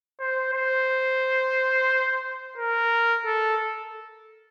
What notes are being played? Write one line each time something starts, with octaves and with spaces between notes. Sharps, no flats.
C5
C5
A#4
A4